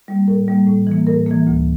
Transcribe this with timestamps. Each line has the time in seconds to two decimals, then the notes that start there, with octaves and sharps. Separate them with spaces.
0.08 G3 A#3
0.28 A2 A#4
0.48 G3 A#3
0.67 A2
0.87 E3 A#3
1.07 A2 A#4
1.26 E3 A#3
1.47 D2